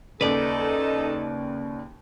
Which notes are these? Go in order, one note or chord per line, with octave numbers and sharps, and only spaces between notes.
D#2 C#3 D#4 A4 B4 D5